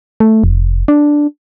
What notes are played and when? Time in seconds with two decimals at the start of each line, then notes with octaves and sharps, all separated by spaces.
0.20 A3
0.44 F1
0.88 D4